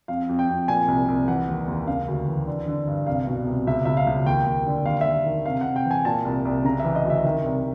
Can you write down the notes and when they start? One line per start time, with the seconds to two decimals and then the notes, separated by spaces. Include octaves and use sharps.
0.08 F2 F5
0.29 F2
0.39 G5
0.49 F2
0.68 A#2 G#5
0.88 C2
1.08 C2
1.28 E3 F#5
1.49 D#2
1.68 D#2
1.87 C#3 F5
2.08 D2
2.28 E3
2.47 D3
2.68 D3
2.87 G2
3.07 C2 F5
3.27 B2
3.47 C2
3.67 C#2 E5
3.85 C#2 E5
3.97 F5
4.07 C#2
4.26 D#2 G5
4.46 D#2
4.67 D3
4.86 D#2 F5
5.01 D#2 E5
5.26 D#3
5.45 C3 F5
5.61 F#5
5.66 C3
5.76 G5
5.85 E3
5.91 G#5
6.05 A#2 A5
6.25 C2
6.45 C2
6.65 C#3 A#5
6.79 E3 E5
6.96 D#5
7.05 D2 E5
7.24 D#3
7.44 C2